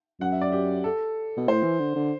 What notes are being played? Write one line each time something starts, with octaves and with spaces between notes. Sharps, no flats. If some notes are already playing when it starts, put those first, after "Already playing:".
F#2 F#5
E5
D5
G4
A4
B2
A2 C5
E3
D3
D3